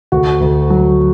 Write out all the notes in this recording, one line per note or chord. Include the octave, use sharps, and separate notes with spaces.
D2 F#4
D2
F#3